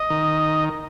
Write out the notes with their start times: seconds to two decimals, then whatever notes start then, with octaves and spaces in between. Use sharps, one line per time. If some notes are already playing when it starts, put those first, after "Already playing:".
Already playing: D#5
0.10 D#3